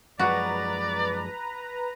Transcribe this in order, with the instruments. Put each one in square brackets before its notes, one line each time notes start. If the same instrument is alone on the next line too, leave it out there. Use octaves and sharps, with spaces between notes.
[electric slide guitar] F#2 F3 G#3 [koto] F#4 [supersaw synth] B4 A#5 [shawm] D5